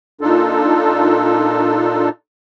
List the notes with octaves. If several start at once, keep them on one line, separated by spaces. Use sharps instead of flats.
A#2 D4 D#4 F4 A4